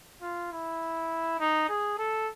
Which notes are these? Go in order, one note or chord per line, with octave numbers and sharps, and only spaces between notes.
F4
E4
D#4
G#4
A4